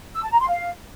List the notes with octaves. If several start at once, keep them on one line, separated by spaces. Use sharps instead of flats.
E6
A5
A#5
C6
F5